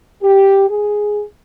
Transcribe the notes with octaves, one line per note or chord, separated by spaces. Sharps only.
G4
G#4